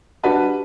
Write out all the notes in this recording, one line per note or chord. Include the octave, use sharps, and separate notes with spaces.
G3 D4 F#4 B4